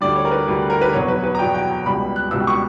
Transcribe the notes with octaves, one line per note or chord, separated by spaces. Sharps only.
D2 D3 G3 D5
C#5
A#4
B4
D2 D3 G3
A#4
B4
E2 B2 F#3 C#5
B4
B4
A#5
E2 B2 F#3 G5
G5
C#2 B2 G3 B5
F#6
C#2 B2 G3 E6
C#6